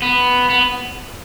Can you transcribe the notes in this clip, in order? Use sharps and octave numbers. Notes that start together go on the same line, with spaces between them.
B3
B3